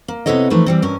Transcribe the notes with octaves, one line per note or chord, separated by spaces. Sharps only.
A#3
C3 B3 E4 A4 C#5 D#5
E3 F3 A3 D#4 E4 B4
E3 G3 C4
G2 E3 C#4 A#4